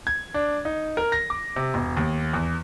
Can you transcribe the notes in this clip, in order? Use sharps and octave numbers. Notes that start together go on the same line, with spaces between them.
G#6
D4
D#4
A#4
A#6
D6
C3
E1
D#2
E2